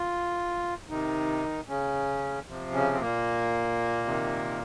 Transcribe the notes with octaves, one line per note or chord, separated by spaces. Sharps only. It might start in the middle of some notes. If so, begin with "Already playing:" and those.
Already playing: F4
C3 D#3 D#4
C#3 C#4
C3 F3
C#3 C#4
C4
A#2 A#3
C3 D#3